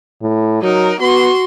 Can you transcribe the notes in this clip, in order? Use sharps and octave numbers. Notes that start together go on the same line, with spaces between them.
A2
F#3 D#4 A#4
B3 F#4 C6